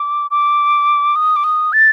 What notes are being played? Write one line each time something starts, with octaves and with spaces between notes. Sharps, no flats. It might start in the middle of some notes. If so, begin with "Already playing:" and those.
Already playing: D6
D6
D#6
D6
D#6
A6